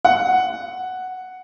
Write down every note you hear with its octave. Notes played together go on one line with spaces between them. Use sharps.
F#5